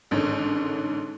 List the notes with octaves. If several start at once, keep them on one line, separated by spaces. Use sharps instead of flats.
A1 G#2 D3 D#3 C#5